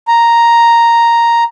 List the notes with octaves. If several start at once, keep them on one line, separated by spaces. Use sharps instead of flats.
A#5